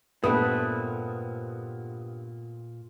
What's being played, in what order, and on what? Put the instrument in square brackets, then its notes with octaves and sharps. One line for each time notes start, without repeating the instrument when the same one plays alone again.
[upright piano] G2 B3 D#6 [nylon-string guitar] A#2 [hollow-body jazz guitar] A3 C4 [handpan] A4 B4